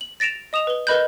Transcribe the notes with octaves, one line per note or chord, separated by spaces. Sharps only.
F#7
A6 A#6 D7 E7 F7
D#5 D#6 E7 F7
B4 G7
A#4 B4 D#5 B5 F#6 G6